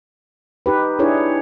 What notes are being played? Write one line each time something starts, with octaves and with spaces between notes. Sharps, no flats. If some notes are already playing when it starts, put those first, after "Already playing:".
D#4 G4 B4
D4 E4 G#4 B4 C#5